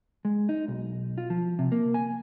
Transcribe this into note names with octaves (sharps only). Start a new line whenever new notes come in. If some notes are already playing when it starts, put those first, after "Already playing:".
G#3
D#4
B1
F4
F3
C3
A#3
G#5